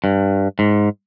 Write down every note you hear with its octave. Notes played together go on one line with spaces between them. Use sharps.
G2
G#2